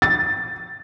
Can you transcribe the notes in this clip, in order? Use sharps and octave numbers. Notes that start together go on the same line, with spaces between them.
A6